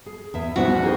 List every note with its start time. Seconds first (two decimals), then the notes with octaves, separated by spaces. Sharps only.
0.06 G#4
0.34 E2 E5
0.56 C2 G#2 B3 D4 E4 F#4
0.70 E2 F#6
0.83 D#4 E4 G4 G#4 A#4 C5